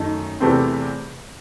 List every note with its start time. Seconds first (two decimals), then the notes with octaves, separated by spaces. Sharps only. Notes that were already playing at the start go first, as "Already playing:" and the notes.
Already playing: F#2 D#3 A3 D#4
0.40 E2 C3 E3 A3 C4